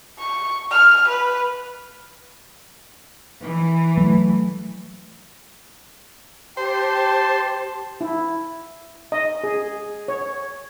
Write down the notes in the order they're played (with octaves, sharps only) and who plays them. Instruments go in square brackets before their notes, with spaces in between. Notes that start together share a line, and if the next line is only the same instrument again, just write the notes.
[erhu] C#6
F6
B4
[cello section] E3
[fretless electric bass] F#3 A3
[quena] G4 [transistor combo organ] C5 [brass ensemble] G5 [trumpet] A5
[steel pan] E4
D#5
G#4
C#5